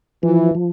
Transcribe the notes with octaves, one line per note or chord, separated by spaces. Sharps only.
E3 F3
F3